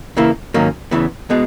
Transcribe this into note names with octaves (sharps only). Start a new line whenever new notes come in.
C#3 E3 A#3 E4
G#2 D#3 F#3 A#3 C#4
E2 C#3 E3 B3
B2 G#3 B3